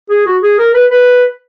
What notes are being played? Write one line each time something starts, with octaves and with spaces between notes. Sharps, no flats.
G#4
F#4
G#4
A#4
B4
B4